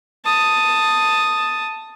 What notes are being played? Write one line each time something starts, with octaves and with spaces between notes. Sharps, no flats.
A5 D#6